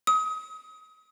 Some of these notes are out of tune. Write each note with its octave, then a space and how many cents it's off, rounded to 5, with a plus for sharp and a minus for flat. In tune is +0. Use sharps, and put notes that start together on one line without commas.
D#6 +35